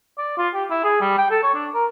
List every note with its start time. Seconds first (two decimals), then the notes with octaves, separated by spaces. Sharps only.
0.18 D5
0.38 F4
0.54 G4
0.70 E4
0.84 G#4
1.01 G3
1.18 G5
1.30 A4
1.43 C#5
1.54 D4
1.74 A#4